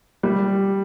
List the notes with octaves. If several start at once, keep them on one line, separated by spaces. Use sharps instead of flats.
G3